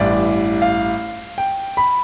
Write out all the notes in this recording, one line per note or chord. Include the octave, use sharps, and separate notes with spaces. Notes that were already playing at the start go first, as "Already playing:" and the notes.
Already playing: A1 G2 E3 D5
F5
G5
B5